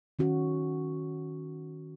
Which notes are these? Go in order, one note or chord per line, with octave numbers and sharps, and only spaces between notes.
D#3 C#4 F#4